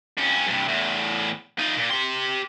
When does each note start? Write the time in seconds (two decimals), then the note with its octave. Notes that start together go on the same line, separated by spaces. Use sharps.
0.18 F2 C#4
0.47 G2 C3
0.68 E2 A2
1.58 D#4 F4
1.77 A#2
1.91 G4 C6